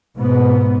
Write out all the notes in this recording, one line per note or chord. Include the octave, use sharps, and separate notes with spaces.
G#2 B2 B3